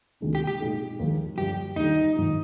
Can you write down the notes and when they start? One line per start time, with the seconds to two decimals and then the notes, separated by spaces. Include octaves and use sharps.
0.21 D2 C3 D#3 G#3 D4
0.35 G4
0.47 G4
0.60 A#2 G#3 D#4 G#4
0.99 D#2 D3 F3 G#3
1.38 G2 D3 F3 G4
1.76 D#2 D3 G3 D#4
2.15 G#2 D#3 A#3 F4